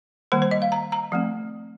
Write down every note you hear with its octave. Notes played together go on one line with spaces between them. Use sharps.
D#3 G3 A#3 C5
C5
D#5
F5
A#5
A#5
F3 A3 C4